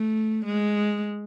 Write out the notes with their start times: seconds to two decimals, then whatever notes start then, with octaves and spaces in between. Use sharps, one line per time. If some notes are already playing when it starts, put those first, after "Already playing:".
Already playing: A3
0.45 G#3